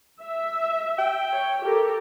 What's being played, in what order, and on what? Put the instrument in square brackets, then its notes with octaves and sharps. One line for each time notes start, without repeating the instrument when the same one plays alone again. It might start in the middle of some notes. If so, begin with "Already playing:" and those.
[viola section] E5
[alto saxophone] G5
[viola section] C#5
G4 A4 A#4